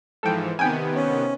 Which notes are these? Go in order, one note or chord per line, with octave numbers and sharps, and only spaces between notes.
G#2 E3 F3 A4 G5
C3 D#3 B3 G5 G#5
C#4